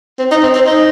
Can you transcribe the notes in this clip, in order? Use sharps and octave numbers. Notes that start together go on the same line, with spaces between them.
C4
D#4
C4
C4
D#4